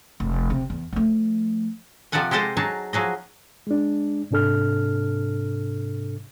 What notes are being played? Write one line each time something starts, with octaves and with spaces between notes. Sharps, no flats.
F1
C3
E2
F3 A3
C3 F3 A4 D5 F#5 G#5
G#3 G4 A4 C5 D#5 A5
F#3 D#4 G#4 A5
F3 F#3 G#4 D#5
G#3 D4
G#2 C3 D4 A4 F6